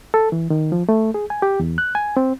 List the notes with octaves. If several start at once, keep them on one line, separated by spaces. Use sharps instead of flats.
A4
E3
D#3
F3
A3
G#4
G#5
G4
E2
F#6
G#5
C4